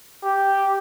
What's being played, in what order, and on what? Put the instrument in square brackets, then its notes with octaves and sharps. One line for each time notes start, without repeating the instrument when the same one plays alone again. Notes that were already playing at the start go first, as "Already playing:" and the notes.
[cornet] G4